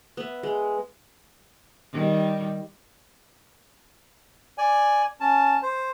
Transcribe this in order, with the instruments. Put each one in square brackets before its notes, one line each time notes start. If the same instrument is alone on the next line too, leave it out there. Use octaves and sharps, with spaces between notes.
[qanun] B3 E5
G#3
[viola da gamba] D#3 G3
[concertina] D5 G#5
C#4 A5
C5